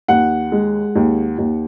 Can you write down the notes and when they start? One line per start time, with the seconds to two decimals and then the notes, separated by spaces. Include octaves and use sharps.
0.08 D#2 F#5
0.52 G#3
0.95 D#2
1.38 D#2